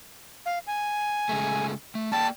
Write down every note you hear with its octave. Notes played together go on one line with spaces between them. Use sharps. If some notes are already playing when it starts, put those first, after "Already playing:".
F5
G#5
C#3 G#3 A3
A3
A#3 D5 G5 A5